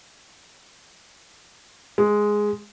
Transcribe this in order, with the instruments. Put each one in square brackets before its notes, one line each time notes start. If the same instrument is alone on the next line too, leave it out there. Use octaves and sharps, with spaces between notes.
[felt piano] G#3